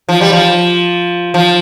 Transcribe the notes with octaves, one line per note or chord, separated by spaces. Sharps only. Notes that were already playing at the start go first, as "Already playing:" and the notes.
F3
G3
F3
F3